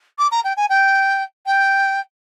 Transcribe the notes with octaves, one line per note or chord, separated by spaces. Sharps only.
D6
A#5
G5
G#5
G5
G5